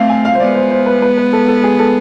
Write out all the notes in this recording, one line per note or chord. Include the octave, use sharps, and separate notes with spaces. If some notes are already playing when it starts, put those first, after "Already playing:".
Already playing: A3 C4 E5 F5
G#5
F5
C5
G#3 B3 D5
C5
C5
B4
B4
B4
A4
A4
G#4
A4